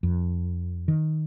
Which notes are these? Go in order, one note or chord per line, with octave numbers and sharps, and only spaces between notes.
F2
D#3